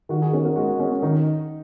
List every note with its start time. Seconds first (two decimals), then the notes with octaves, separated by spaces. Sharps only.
0.09 D#3 F#4
0.21 D#4 G#4
0.33 C#4 F#4 A#4
0.44 F#4 A#4
0.56 G#3 F#4
0.80 C#4
1.02 D#3 D#4